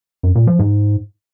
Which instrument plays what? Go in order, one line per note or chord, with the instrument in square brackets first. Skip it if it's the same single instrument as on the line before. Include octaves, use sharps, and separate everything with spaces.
[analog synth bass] F#2
A#2
F3
G#2